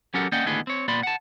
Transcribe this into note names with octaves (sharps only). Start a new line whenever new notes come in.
F#3 C#4 G4 A4 A#4 F#5
A#3 C#4 D5 D#5 F#5 G5
D#2 A2 D3 B3 G#4 D#5
C4 C#5
A#2 B3 D5 B5 C6
F#5 A5